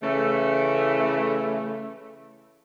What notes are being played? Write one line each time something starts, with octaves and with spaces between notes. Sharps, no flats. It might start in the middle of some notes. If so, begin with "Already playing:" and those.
C#3 E3 A3